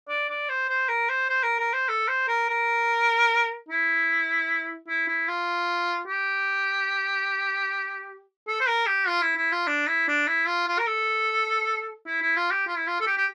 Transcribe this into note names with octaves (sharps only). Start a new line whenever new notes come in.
D5
D5
C5
C5
A#4
C5
C5
A#4
A#4
C5
A4
C5
A#4
A#4
E4
E4
E4
F4
G4
A4
C5
A#4
G4
F4
E4
E4
F4
D4
E4
D4
E4
F4
F4
A#4
A4
E4
E4
F4
G4
F4
E4
F4
A4
G4
G4